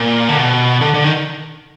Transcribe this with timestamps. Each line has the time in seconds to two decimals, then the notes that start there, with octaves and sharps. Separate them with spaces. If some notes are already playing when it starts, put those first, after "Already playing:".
Already playing: A#2
0.29 D3
0.37 B2
0.81 D3
0.94 D3
1.04 D#3